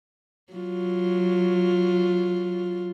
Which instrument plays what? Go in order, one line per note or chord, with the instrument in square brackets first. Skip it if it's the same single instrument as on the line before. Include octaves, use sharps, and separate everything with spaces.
[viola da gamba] F#3 F4